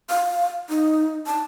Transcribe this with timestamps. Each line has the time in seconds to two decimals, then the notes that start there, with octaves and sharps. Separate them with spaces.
0.10 F5
0.69 D#4
1.26 A5